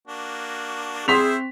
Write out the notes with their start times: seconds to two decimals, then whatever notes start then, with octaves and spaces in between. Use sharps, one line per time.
0.07 A#3 D4 F#4
1.08 C4 E4 G#4 C5 E5 C6 B6 F7